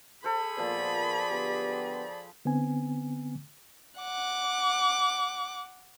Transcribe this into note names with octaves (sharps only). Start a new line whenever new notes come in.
G#4 A4 C5 B5
A#2 F3 A#3 B3 C5 D5
D3 B3 G4
D3 B3 C4 G#5
F#5 D6